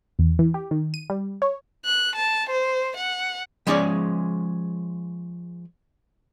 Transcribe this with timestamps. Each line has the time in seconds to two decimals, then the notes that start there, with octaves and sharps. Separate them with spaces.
0.19 E2
0.39 E3
0.54 G4
0.71 D#3
0.94 D#7
1.10 G3
1.42 C#5
1.85 F#6
2.15 A5
2.50 C5
2.97 F#5
3.67 F3 G#3 C#4 G#4 C#5 D5